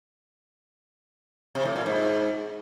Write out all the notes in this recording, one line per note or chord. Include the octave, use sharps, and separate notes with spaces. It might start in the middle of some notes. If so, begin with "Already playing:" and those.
C3
A2
A#2
G#2